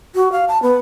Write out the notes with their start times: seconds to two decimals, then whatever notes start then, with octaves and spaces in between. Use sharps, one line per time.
0.15 F#4
0.32 F5
0.48 A5
0.63 B3